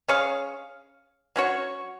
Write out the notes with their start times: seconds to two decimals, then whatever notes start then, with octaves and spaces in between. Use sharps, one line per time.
0.08 C#4 G#4 C#5 F5
1.36 F#3 C#4 F#4 C#5